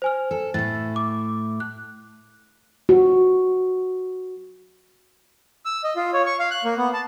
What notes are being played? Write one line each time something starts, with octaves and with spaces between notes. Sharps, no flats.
C5 G#5 F6
A4
A2 A3 A6
D6
F#6
F#4
E6
D#5
F4
C#5
C#6
F5
F#6
A#3
B3
A5